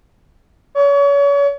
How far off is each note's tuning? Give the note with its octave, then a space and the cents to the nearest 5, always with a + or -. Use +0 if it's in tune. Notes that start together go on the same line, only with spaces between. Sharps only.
C#5 +35